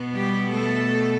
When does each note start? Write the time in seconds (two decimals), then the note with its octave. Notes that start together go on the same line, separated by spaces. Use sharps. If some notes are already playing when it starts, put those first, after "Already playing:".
Already playing: B2 B3
0.15 G3 G4
0.53 A3 A4